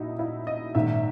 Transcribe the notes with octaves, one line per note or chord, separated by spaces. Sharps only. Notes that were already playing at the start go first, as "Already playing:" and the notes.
Already playing: A#1 A#2 D#4 E4 F#4
E4
D#5
A#1 G#2 D#3 E5